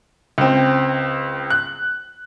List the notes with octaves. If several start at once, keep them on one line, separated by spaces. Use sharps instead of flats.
C#2 C4
F#6